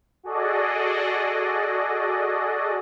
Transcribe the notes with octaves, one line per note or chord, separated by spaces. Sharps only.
F#4 G#4 A4 D5 D#5